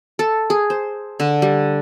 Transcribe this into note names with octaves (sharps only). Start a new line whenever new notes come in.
A4
G#4
C5
D3
G3